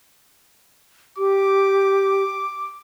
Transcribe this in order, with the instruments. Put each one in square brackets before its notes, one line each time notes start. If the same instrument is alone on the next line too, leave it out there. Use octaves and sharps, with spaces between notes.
[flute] G4 [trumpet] D6